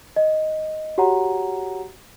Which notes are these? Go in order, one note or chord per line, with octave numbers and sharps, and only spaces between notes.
D#5
F#4 G4 C#5 F#5 A#5